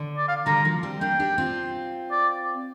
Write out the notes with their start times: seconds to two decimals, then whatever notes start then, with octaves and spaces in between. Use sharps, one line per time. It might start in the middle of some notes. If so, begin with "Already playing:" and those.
Already playing: D3
0.17 D5
0.28 F5
0.46 D3 G3 A#5
0.65 F3 A#3
0.83 G3 C4
1.01 A#3 D4 G5
1.19 D4 G4
1.38 C4 F4
2.11 D5